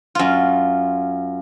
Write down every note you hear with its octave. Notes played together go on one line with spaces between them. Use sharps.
F#2 F4